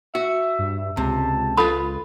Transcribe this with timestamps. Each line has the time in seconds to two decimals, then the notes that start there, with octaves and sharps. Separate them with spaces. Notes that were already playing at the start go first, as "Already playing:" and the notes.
0.15 F#4 E5
0.59 G2
0.97 C#2 C3 A5
1.57 F4 A4 B4 B5